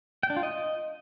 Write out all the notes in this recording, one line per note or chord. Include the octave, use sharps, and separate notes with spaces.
G5
D4
F4
D#5